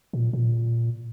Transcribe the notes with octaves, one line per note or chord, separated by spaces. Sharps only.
A#2
A#2